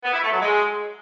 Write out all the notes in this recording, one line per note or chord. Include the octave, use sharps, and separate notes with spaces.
B3
E4
A3
F#3
G#3